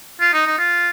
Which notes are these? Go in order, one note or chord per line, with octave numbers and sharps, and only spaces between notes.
F4
D#4
D#4
F4